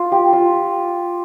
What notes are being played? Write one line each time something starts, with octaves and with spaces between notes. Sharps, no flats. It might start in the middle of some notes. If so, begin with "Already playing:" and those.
Already playing: F4
G4
F4